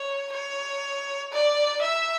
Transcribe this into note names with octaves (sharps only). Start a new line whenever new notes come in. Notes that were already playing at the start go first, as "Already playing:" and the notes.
Already playing: C#5
C#5
D5
E5